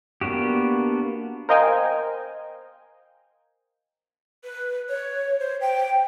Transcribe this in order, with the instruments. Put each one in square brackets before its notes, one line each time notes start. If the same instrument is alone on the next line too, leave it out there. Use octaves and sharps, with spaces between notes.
[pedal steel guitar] A#3 B3 D4 F#4 G4
[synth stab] A#4 C5 D#5 F5 G5 G#5
[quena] B4
C#5
C5
G5